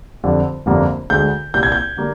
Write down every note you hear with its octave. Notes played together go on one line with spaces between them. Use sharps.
F2 D3 G3
G1 F2 D3 G3 A#3
D2 D3 G#3 G6
C2 A#2 G3 G6
G#6
G6
D3 G3 A#3